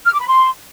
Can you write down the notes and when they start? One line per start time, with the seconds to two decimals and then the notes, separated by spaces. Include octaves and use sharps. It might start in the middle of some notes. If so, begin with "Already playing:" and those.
0.06 F6
0.14 D6
0.21 B5
0.28 C6